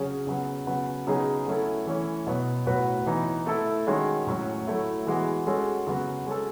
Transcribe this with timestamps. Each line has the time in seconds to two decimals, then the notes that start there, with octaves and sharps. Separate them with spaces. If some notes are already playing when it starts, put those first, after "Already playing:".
Already playing: C#3 F#3 C#4 G#4
0.27 C#3 F#3 B3
0.67 C#3 F#3 B3
1.07 C#3 F#3 B3 D#4 G#4
1.47 F#3 A3 C#4 E4 A4
1.87 E3 A3 C#4 E4
2.27 B2 F#3 B3
2.67 A2 F#3 B3 F#4 B4
3.06 E3 B3 D#4
3.46 A3 E4 A4
3.87 D#3 G#3 C#4 F#4
4.27 A2 F#3 C#4
4.67 F#3 A3 E4
5.07 E3 G#3 B3 F#4
5.47 G#3 C#4 F#4 A4
5.87 C#3 F#3 B3 F#4
6.26 G#3 C#4 F#4 A4